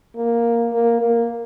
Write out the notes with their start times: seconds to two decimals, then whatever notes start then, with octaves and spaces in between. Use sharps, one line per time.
0.16 A#3
0.73 A#3
1.01 A#3